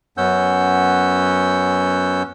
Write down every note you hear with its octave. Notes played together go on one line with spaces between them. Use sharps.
F#2 B3 C#4 F#5 E6 G6